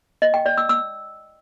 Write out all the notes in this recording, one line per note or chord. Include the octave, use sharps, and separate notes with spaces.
D#5
G5
D5
E6
E6